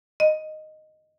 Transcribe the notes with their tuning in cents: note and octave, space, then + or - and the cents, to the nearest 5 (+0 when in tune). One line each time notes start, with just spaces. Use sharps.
D#5 -5